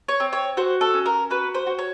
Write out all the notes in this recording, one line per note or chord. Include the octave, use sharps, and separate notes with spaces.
C#5
C4
C#5
F#4 C5
A4
C#4
A#4
F#4 B4
C5
F#4
C#5